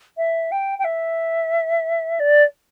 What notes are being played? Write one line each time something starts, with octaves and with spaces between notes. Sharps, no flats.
E5
G5
G5
E5
D5